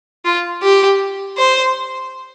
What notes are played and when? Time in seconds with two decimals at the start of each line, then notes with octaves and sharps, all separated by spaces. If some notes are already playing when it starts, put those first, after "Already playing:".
0.25 F4
0.63 G4
1.37 C5